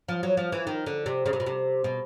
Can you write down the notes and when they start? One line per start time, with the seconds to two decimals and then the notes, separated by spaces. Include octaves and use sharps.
0.08 F3
0.23 F#3
0.37 F3
0.52 E3
0.67 D#3
0.86 D3
1.06 C3
1.26 C#3
1.33 C3
1.40 B2
1.46 C3
1.84 B2